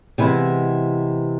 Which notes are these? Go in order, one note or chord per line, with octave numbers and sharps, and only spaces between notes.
C3 E3 G#3 B3 E4